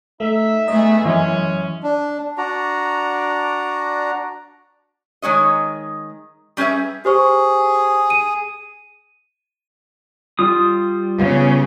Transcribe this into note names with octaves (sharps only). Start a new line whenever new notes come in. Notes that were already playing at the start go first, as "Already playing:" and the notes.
A3 D#4 E5
A3 B3 G#4 D#5
F#2 E3 G#3 C#4
D4
D4 F#4 D5 A#5
D#3 G#3 C#5 D#5
G3 C#4 G#4 B4 E5
G4 G#4 C5 C#6
D#7
G3 F4 D#6
C#3 B3